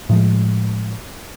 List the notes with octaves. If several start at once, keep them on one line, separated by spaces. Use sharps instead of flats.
A2 F3 G#3